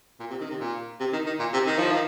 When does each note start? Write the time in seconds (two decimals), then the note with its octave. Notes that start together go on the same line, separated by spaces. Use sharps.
0.20 A#2
0.30 C3
0.41 D#3
0.50 C3
0.60 A#2
1.00 C3
1.13 D#3
1.27 D#3
1.39 A#2
1.53 C3
1.67 D#3
1.79 F3
1.91 D#3